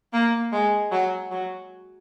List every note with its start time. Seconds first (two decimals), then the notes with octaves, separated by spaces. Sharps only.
0.13 A#3
0.52 G#3
0.92 F#3
1.31 F#3